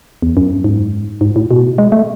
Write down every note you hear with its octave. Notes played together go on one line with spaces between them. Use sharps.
E2
F#2
G#2
G#2
A2
B2
G#3
A3